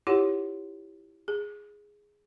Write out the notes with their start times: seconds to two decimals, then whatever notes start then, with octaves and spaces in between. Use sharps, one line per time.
0.07 E4 F4 G4 C#5 F#5 C6
1.28 G#4